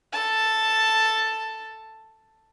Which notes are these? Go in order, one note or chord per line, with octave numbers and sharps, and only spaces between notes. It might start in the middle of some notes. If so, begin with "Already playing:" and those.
A4 A5